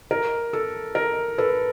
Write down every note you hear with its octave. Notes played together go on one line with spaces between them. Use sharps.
A#4
A4
A#4
A4 B4